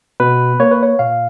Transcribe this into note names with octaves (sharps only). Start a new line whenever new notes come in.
B2 B4
A#3 C#5
B4
C#5
A#2 F5